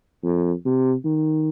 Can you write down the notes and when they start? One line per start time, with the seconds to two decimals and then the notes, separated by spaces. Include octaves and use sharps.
0.24 F2
0.65 C3
1.05 D#3